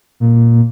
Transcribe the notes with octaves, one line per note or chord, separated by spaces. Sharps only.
A#2